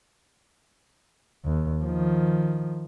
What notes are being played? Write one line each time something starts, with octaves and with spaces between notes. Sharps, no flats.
D#2
D#3 F3